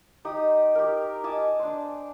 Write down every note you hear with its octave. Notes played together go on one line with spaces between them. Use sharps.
D#4 G4 D#6
G4 A#4
D#5 G#5 A5 D6
D4 C5